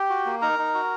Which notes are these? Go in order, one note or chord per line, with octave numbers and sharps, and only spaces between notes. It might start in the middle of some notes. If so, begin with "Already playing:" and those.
Already playing: G4 G5
F#4
A#3
D#4 A#4 A#5
D#4
F#4